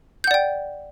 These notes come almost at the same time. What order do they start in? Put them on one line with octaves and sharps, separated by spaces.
G6 F#5 D5 G5